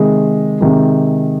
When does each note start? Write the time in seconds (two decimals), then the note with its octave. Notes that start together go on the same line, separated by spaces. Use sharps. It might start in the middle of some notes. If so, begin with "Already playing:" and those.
Already playing: C3 D#3 G#3
0.61 C3 D#3 G#3